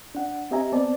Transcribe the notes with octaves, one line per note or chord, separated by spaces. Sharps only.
D4 F#5
C4 G4 D#5 E5 G#5 A#5
B3 C4 D5 A5